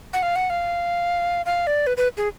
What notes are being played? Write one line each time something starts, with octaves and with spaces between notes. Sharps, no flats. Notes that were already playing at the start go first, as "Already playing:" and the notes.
F#5
F5
F#5
F5
F5
D5
B4
B4
G#4